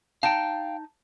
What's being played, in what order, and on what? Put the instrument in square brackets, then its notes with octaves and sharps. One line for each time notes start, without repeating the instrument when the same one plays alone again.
[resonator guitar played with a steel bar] D#4 A5 [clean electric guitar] F5 G5